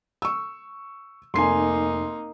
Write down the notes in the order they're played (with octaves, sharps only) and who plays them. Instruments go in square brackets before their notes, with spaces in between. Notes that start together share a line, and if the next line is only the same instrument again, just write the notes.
[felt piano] C#6 E6
[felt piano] F1 C7 [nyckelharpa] A#3 D#4 [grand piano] G#5 C6